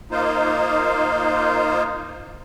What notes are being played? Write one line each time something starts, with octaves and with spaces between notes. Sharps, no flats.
A#3 D#4 F4 C5